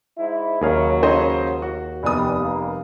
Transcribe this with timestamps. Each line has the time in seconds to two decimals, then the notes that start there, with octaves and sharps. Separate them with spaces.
0.17 G#2 E4
0.62 D#2 C#3 F#3 G#4 F5
1.03 C#4 C5 D#5
1.62 F#4
2.03 F1 G3 B3 D#6
2.39 G3 A#3